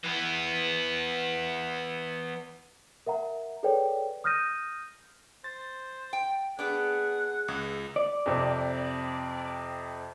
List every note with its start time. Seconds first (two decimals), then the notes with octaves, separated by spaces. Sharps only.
0.04 E3 B3
3.06 A#4 E5 F#5 A#5
3.63 G#4 A4 B4 C#5 D5 G5
4.24 D#6 F6 G6 A#6 D#7
5.44 C5 A6
6.13 G5
6.59 B3 D4 G#4 F#5
7.48 C#2 G#4
7.96 D5
8.26 F2 C3